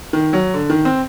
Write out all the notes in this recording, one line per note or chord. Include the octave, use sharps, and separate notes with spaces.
D#3
F#3
D3
D#3
C4